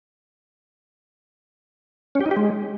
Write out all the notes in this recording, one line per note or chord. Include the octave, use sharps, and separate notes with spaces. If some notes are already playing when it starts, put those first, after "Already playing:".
C#4
G4
D#4
G4
G#3